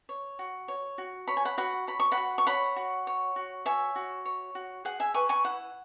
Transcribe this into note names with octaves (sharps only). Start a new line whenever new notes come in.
C#5
F#4
C#5
F#4
C#5 B5
G#5
F#5 B5
F#4 F#5 B5
C#5 B5
C#6
F#5 B5
F#4
C#6
C#5 F#5 B5
F#4
C#5
F#4
C#5 E5 G#5
F#4
C#5
F#4
G#4 F#5
E5 G#5
B4 G#5 C#6
G#5 C#6
E4 F#5